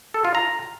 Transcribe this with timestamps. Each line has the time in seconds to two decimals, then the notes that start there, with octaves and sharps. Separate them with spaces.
0.14 A4
0.25 F4
0.35 A#5